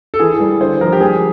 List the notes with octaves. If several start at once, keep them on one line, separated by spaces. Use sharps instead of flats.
A4
E3 G#4
G3
D3 C5
F3 A#4
G4
G3 G#4